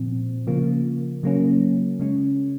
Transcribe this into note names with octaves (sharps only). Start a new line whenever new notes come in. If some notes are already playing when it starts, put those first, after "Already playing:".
Already playing: A#2 F3 C4
C#3 F3 A#3
C#3 F#3 A#3 C#4
C#3 G#3 C#4